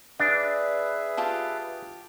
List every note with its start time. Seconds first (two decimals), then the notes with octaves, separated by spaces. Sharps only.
0.20 D4 G#4 B4 E5
1.17 F4 G4 A5